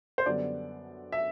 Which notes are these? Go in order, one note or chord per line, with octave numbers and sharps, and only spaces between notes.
C5
F#2 D3 G3 B3 D5
E5